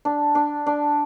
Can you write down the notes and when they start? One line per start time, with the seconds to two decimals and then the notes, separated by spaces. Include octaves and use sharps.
0.05 D4
0.35 D4
0.67 D4